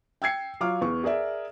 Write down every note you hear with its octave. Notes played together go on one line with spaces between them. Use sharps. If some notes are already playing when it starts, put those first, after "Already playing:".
G5 E6 G#6 C7 C#7
F#3 F4 D6 F6
E2 C#6
G#4 A#4 D5 E5